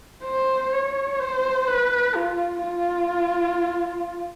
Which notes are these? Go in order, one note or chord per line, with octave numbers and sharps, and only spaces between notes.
C5
C#5
C5
B4
F4
F4